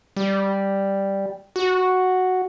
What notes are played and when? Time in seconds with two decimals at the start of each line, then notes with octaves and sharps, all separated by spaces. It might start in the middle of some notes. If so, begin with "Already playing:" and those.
0.17 G3
1.56 F#4